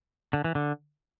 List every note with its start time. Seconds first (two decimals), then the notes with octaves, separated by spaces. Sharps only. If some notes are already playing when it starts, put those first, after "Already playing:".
0.33 D3
0.44 E3
0.55 D3